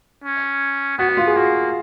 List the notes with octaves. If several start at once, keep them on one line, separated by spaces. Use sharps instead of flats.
C#4
B3 F#4
F#4
F4
G#4
A#3 F#4